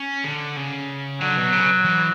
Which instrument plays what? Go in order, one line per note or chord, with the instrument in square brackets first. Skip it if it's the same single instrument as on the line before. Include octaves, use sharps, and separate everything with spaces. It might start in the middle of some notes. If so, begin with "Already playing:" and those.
Already playing: [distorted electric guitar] C#4
D3
C#3
[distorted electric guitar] D3 [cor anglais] F#3
[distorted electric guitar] B2
C#3
E3